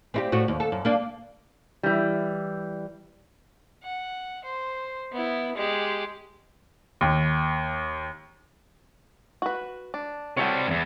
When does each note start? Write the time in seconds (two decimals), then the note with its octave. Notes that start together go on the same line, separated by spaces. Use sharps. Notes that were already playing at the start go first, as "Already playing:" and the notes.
0.14 C4 E4 G4
0.32 A2 F#4
0.48 D#2
0.60 A4
0.72 F#2
0.85 A#3 D4
1.83 E3 G3
3.83 F#5
4.44 C5
5.12 B3 E4
5.55 G#3 G4
7.01 D#2
9.42 F#4 B4
9.94 D4
10.37 C3 G3 F#4 A4 C#5
10.67 E2 G2